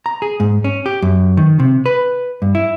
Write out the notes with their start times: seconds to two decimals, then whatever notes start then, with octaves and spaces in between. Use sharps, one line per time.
0.06 A#5
0.22 G#4
0.40 G#2
0.64 C#4
0.86 G4
1.02 F#2
1.37 D#3
1.60 C3
1.86 B4
2.42 G2
2.55 E4